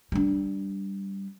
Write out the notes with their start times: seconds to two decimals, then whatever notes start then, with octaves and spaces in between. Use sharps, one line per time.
0.12 G3 D4